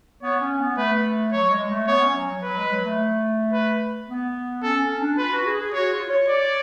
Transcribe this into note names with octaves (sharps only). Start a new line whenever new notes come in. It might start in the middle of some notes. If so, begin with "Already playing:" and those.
B3 C#5
C#4
B3
A3 B4
F#3 C#5
G#3
A3
B3 C#5
C#4
F#3
F#3
F#3 B4
G#3
F#3
A3
B4
B3
C#4 A4
C#4
D4
F4 B4
F#4
G#4
G#4
F#4 C#5
F4
C#5
D5